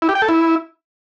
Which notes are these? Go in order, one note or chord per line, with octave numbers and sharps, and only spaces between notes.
E4
G4
G5
A4
E4